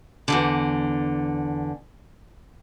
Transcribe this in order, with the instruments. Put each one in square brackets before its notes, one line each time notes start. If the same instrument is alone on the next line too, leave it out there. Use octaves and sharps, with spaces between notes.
[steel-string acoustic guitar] E2 G2 D3